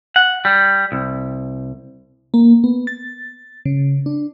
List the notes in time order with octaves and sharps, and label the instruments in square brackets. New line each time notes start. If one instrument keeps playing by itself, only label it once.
[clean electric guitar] F#5
G3
C2
[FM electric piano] A#3
B3
A6
C#3
D4